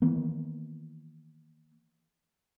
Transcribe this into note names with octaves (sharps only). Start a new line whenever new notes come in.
D#3 E3 A#3 B3